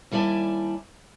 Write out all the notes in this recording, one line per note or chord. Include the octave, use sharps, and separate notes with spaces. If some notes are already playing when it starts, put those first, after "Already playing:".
D#2 G3 E4 D5 G#5 A5